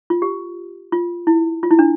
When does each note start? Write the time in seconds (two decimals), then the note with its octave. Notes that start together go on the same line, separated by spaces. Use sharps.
0.10 F4
0.22 G4
0.92 F4
1.27 E4
1.63 F4
1.71 E4
1.79 D4